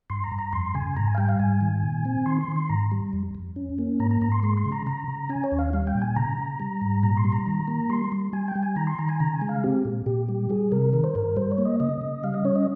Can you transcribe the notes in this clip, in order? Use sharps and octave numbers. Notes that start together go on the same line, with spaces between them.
G2 C6
A#5
G2
A#5
F2 C6
C#3 G#5
G#2 A#5
G#5
F5
G3 G5
F5
G#2 G#5
D#3
A#2
C4
D#3 C6
C6
D#3
C6
G#2 A#5
G3
F2
F2
C#4
A#3
G#2 A#5
A#5
G#2 A#5
C6
G#3 C6
C6
C#3
A#5
C#3 A#5
C#3
C#4 G#5
C#5
D#2
F5
G3 F5
G5
A#2
G#5
C#3 A#5
C#3
G3
G#2
A#2 A#5
C6
G3
A#5
D#3
A#3
G3 C6
G3
G3 G#5
G5
G3
G#5
D#3 A#5
C6
D#3 A#5
G#5
C#3 A#5
G#5
G#3
F5
C4 G4
A#2
A#2 G4
G3
G3 G#4
C3 A#4
D#3 A#4
C5
G2 A#4
G3 C5
C#5
A#3
D#5
C#3 D#5
C#3
G3 F5
D#5
C#4 C#5
D#5